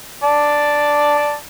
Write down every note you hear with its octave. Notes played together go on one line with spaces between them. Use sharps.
D5 A5